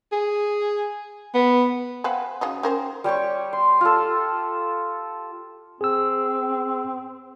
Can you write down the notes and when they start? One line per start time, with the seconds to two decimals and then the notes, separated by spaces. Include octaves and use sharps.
0.12 G#4
1.34 B3
2.04 C4 B4 F5 F#5 G#5
2.41 C#3 F#3 D#4
2.63 C#4 A#4 C5 G5
3.04 G3 G4 C#5 C#6
3.53 C6
3.81 F4 A4
5.81 C4 G#4 E6